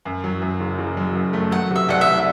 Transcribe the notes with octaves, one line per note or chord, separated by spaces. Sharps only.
F#2
F#3
F#2
F#1
F#1
F#3
F#2
A3
F#3 F#5
C3
E5
C2 F#5
E5
C2